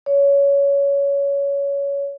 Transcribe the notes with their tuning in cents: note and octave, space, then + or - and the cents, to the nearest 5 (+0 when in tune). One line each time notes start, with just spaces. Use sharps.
C#5 +20